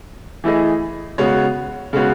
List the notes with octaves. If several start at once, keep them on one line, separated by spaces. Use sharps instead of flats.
E3 A3 E4 G#4 D#5
C#3 G#3 B3 F#4 C#5
C#3 G#3 B3 F#4 C#5